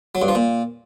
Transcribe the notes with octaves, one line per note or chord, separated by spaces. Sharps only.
F#3
G2
F3
A#2